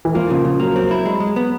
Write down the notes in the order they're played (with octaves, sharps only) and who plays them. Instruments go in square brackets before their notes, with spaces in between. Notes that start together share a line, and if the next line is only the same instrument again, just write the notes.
[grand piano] E3
[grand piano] F3 [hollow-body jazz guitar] A#3
[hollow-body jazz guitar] C#3 [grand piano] F3
[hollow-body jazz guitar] C#3 [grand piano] F3
[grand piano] F#3 [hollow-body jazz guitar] A#3
[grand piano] F#3 [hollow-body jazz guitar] C4
[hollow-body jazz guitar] E4
G#3
G#3
B3